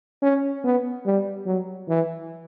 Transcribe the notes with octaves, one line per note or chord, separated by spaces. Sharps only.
C#4
B3
G3
F#3
E3